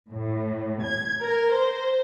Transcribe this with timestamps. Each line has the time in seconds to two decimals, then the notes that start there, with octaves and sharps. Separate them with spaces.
0.11 A2
0.83 G#6
1.22 A#4
1.54 C5